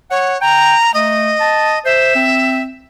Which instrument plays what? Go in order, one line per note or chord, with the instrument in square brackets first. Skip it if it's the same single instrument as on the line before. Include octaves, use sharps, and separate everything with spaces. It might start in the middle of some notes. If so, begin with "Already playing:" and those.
[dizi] C#5 [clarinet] F#5
[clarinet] G5 [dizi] A#5
[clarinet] A3 [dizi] D#5
[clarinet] A5
[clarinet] C5 [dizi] E5
[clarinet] C4